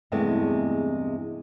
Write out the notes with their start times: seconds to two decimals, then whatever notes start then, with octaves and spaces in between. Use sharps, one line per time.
0.12 E2 G2 C3 G#3 A3 C4